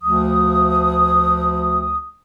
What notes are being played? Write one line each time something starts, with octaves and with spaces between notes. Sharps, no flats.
D2 F3 D#6